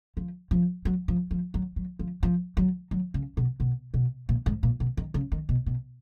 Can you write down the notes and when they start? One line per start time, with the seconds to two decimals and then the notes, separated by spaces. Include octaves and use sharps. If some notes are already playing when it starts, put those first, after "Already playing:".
0.17 F3
0.51 F3
0.85 F#3
1.08 F3
1.31 F3
1.54 F#3
1.76 F#3
1.99 F3
2.23 F3
2.57 F#3
2.91 F#3
3.14 C#3
3.37 B2
3.60 B2
3.94 B2
4.29 A#2
4.46 G#2
4.63 A#2
4.80 B2
4.97 D#3
5.14 C#3
5.32 D#3
5.49 B2
5.66 B2